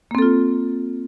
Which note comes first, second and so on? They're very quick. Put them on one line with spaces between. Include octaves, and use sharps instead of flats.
A#3 C4 A4 F4